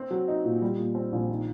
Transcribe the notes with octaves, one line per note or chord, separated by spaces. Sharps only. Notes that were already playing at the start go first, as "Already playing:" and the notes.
Already playing: C4
F#3
D#4
A#2
G3
A#2
C4
A#1
D#3